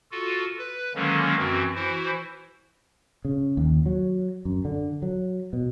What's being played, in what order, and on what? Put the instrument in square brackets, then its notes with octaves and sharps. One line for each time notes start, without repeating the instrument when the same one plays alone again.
[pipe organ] F4 F#4 A4
B4
D3 D#3 F#3 G#3 A#3 C#4
F#2 E3 C4 F#4
E3 E4 F#4 C5
[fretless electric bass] C#3
D#2
F#3
F#2
D3
F#3
B2